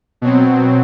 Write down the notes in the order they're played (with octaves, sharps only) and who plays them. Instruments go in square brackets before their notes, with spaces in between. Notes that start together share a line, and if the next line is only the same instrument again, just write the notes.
[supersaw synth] B2 F#3 C4